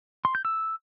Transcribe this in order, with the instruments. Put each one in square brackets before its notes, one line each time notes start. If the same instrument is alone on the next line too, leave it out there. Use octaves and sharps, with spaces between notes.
[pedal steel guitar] C6
G6
E6